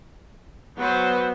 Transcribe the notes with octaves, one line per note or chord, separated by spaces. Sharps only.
F#3 B3 B4 C5